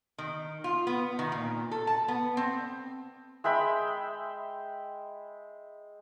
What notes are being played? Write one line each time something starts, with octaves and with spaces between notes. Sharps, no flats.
D#3
F4
B3
D#3
A#2
A4
A5
B3
C4
G#3 E5 G5 B5